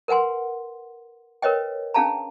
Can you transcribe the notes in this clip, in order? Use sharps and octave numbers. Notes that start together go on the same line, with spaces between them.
A#4 B4 F#5 G#5 C6
A#4 B4 C#5 D#5 G5
C#4 D4 G#4 F5 A5 A#5